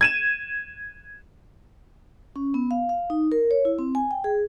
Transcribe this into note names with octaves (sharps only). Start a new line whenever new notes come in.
G#6 D#7 E7
C#4
B3
F5
F5
D#4
A#4
C#5
E4
C4
G#5
G5
G#4